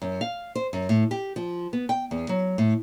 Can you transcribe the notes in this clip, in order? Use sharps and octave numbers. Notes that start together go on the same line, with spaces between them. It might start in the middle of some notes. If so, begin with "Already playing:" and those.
F#2
F5
C5
F#2
A2
G4
F3
B3
G5
E2
F#3
A2